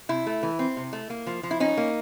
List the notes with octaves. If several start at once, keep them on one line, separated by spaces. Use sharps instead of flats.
C3 E4
A3
E3
C4
C3
A3
A#3
F3
F3
E4
C#4 D#4
A#3